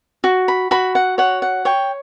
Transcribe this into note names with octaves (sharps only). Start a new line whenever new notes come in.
F#4
B5
F#4 B5
F#5
C#5 F#5
F#5
C#5 G5